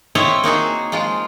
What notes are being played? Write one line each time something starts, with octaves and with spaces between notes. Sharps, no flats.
C4 E4 F4 C#5 D#5 E5
A#3 D#4 F#4 G#4
F3 G#3 F4